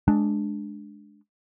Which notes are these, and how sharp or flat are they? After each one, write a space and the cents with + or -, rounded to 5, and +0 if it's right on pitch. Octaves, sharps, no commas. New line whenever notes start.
G#3 +15 D4 +0